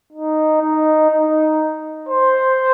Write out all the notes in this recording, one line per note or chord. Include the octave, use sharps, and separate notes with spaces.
D#4
D#4
D#4
C5